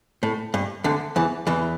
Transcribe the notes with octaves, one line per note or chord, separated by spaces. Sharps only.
A2
G2
D2 D3
E2 E3
E2 E3